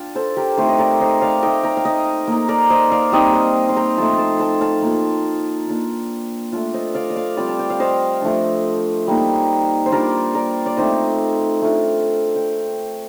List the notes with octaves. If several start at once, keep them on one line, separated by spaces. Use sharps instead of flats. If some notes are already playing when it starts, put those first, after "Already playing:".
Already playing: D4 F4 F5 G5 A5
A4 C5
G4 A#4
A3 C4 D#4 A4 C5
D#5
A#4 D5
C5 D#5
D5 F5
A3 D#4 D#5 G5
G5 A#5
F5
D#5 G5
A#3 D#4
A#4 D5
C5 D#5
D5 F5
G3 C4 D#4 D#5 G5
D#5 G5
C6
G5 A#5
F3 A3 D#4 A5 C6
A5 C6
A5 C6
F5 A5
A#3 F4
A#3 D4 F4
A3 D4 F4
C5 D#5
D5 F5
D#5
D5 F5
G3 C4 F4 D5 F5
A5
G5
F5
C5 D#5
F3 A3 D4
G3 A#3 D#4
C5
G3 D4 F4 A#4 D5
A#4 D5
D5
A3 C4 D#4 C5 D#5
A3 D4 F4
G5